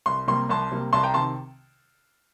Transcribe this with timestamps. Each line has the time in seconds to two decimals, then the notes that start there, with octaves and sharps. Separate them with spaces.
0.06 C2 C6
0.27 C3 G3 A#3 C6
0.49 C2 A5 C6
0.71 C3 G3 A#3
0.93 C2 A5 C6
1.03 G5 A#5
1.14 C3 D#3 A5 C6